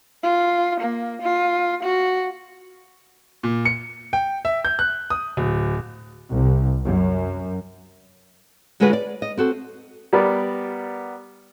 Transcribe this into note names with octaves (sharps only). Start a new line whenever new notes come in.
F4
A#3
F4
F#4
A#2
C#7
G5
E5
G6
F#6
D#6
D1
C2
F#2
D3 G#3 F4 F#4 G#4 B4
D5
D#5
C4 F#4 A4
G3 B3 A#4 D5